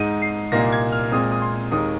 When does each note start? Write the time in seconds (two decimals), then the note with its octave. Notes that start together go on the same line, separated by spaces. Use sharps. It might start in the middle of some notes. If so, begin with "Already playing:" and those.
Already playing: G#2 G#3 D#4 D#7
0.22 C7
0.52 C2 A#2 A#3 D#4 A#6
0.72 G#6
0.92 F6
1.11 A#2 G#3 C4 D#6
1.31 D#6
1.42 C6
1.71 D#2 D#3 G#3 D#6